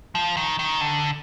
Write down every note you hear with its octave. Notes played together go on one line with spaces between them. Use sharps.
F3
D#3
D#3
D3